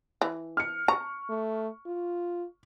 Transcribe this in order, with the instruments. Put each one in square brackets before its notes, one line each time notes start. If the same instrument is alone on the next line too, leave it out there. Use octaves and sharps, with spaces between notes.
[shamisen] E3
[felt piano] F6 C#7
[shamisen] A#5 [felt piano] C#6
[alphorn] A3
F4